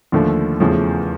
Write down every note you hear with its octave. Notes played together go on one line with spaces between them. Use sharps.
D#2 D3 F3 A3
E2 C#3 F3 A3